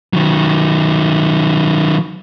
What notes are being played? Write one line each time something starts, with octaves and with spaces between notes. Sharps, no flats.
D#3 F#3